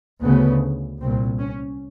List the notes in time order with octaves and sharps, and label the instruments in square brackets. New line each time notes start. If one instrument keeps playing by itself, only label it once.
[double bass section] D2 C#3 B3
C2 A#2 C4
C#4